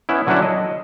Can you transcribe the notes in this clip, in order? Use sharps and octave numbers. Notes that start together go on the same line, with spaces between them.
B3 C#4 E4
D3 F#3 C#4 D4 E4 F#4
D#5